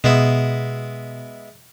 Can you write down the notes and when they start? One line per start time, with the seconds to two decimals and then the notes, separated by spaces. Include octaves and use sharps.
0.04 B2 G#3 B3 E4